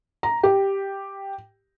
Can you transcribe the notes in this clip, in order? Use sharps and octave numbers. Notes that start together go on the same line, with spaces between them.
A#5
G4